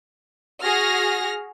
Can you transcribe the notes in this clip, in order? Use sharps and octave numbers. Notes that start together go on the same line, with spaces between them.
F#4 G#4 F6 A#6